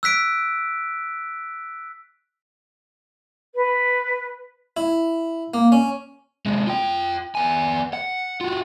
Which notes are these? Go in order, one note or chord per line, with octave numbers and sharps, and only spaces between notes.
E6 F#6 B6 D7
B4
E4
A#3
C#4
C3 G#3
F4 G5
B3 G#5
F#5
F4 F#4